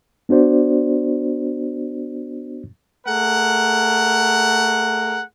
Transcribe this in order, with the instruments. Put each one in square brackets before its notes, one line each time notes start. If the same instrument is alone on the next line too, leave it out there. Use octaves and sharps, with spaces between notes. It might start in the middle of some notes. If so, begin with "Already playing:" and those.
[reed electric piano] B3 D4 F#4 C5 D5
[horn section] A3 G#4 A#4 F#5